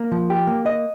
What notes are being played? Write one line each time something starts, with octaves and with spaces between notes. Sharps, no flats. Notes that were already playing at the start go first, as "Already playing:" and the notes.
Already playing: A#3
F3
G4
A#3
D#5